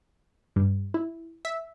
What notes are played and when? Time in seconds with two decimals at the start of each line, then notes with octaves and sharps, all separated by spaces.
0.56 G2
0.94 E4
1.45 E5